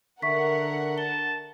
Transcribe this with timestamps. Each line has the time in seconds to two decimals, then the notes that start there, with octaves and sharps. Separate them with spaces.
0.22 D3 A#4 E5 F#5 C#6 B6
0.98 A5 G7